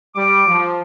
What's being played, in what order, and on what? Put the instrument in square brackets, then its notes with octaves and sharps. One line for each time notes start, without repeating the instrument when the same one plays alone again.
[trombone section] G3 [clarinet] D6
[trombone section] F3